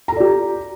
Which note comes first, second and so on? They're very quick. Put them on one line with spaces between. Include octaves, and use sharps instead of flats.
A#5 A4 D5 G4